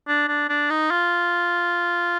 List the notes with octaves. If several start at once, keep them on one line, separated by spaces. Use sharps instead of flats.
D4
D4
D4
D#4
F4